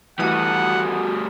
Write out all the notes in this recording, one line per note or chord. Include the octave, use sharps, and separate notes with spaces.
E3 G3 A3 F#4 F#5 D#6